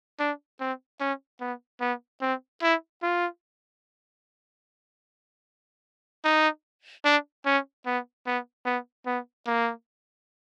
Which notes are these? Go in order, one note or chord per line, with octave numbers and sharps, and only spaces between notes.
D4
C4
C#4
B3
B3
C4
E4
F4
D#4
D4
C#4
B3
B3
B3
B3
A#3